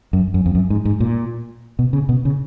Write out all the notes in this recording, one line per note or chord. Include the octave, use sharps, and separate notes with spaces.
F#2
F#2
F2
F#2
G#2
G#2
A#2
B2
C#3
B2
C#3